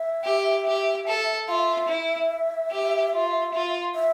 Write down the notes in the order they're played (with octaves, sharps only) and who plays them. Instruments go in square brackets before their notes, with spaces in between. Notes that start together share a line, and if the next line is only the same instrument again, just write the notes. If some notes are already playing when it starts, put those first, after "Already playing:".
Already playing: [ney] E5
[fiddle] G4
G4
A4
[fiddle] F4 [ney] E5 F5
[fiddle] E4
G4
F4
F4
[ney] E5